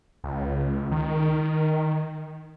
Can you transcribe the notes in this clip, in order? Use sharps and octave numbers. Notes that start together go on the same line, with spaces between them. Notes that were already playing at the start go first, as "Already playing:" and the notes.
C#2
D#3